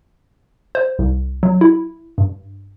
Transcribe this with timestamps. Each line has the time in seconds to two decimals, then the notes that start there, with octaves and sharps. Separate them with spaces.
0.75 C5
0.99 C2
1.43 F#3
1.61 E4
2.18 G2